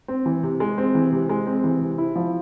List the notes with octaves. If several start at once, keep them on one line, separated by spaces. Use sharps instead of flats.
C4
E3
C3
G#3
C4
E3
C3
G#3
C4
E3
C3
E4
F3